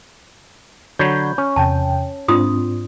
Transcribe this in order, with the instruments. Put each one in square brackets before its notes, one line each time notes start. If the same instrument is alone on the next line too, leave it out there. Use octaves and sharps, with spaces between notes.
[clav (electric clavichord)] D3 F#3 C#5 [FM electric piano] B5 G6
[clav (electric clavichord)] C#4
[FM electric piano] E2 C3 G5 [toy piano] A5
[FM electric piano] G#2 C4 D4 [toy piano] F4 C6 D#6